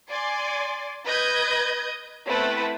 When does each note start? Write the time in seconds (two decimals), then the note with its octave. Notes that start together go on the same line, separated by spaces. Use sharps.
0.10 D5 G#5 C6
1.07 B4 D#5 G6 G#6
2.27 A3 B3 C4 E4 B4